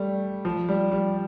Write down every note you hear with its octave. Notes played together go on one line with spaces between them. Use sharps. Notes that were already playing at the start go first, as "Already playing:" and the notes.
Already playing: G3 A3
F3
G3
G3